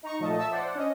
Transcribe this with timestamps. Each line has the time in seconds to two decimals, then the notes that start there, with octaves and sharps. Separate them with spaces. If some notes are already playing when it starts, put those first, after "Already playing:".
0.03 D#4 A#5 C#6
0.19 A#2 F3 A3 D#5 A5
0.37 E5 A5 E6
0.51 C5 D5 F#5
0.75 C#4 D#5